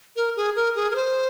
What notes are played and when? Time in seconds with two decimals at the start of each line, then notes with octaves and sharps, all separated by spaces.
0.16 A#4
0.36 G#4
0.56 A#4
0.76 G#4
0.91 A#4
0.95 C5